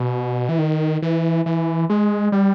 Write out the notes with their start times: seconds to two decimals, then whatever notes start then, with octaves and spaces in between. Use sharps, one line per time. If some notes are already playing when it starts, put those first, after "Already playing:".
Already playing: B2
0.49 E3
0.59 D#3
1.02 E3
1.46 E3
1.90 G#3
2.32 G3